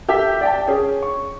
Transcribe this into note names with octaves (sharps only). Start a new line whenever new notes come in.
G4 A4 E5 G6
D5 G5 A5
C#4 G#4
C#6